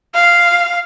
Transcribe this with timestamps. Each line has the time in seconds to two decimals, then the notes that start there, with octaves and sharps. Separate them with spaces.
0.15 F5